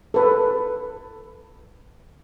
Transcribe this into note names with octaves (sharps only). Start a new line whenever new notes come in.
A4 B4